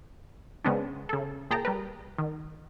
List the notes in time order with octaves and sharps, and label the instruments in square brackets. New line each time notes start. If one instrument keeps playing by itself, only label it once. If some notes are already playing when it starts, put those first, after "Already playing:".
[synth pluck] C#3 G#3 B3 C4 D4
C#3 A4
A#2 G#4 G5 A5 A#5
G3 A#4 B4
D#3